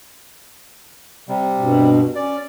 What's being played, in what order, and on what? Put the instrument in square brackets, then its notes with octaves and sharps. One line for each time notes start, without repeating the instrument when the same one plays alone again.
[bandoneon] C3 G3
[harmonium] G2 B2
[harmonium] C#4 [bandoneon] D5